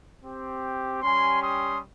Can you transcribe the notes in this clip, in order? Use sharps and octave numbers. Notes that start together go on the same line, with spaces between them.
C4 G4
G3 C#4 G4 G#5 C6
C6 D#6